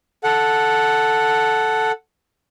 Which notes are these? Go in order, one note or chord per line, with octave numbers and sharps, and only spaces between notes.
A4 F#5